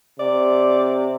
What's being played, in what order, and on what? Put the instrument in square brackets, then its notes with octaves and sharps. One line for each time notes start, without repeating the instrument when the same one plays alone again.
[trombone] C3 [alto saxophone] D5